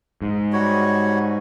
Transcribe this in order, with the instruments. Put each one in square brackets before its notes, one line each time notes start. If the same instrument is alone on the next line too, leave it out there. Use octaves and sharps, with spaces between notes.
[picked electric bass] G#2
[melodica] G3 F#4 C#5